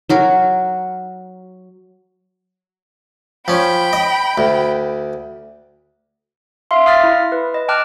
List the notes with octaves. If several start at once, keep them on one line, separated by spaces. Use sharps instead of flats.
F#3 F#4 A#4
F3 C#4 G5 B5
D#5
D2
E5 F5 C6
F5 D#6 F6 A6 B6
E4
B4
D#5
G5 A5 D6 F6 F#6